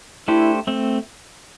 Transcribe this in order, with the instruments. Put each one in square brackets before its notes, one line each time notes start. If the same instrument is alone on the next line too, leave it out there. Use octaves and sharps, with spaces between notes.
[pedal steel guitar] A3 D4 G4 C5 [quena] E4
[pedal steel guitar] A3 C4